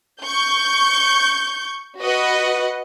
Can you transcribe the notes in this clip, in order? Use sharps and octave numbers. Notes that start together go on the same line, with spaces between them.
C#6 G6
F#4 B4 D#5 F#5